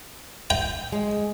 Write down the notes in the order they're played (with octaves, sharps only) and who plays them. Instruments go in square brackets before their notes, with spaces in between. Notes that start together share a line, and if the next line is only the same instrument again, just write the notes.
[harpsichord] G5
[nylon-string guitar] G#3